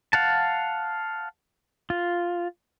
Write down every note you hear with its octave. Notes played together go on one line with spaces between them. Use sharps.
F5 F#5 A5
F4